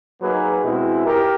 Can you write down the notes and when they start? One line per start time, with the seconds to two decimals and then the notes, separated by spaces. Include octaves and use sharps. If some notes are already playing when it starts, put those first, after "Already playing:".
0.22 F#3 A#3 D#4 G#4 B4
0.64 B2 G#3 C4 E4
1.06 G4 A#4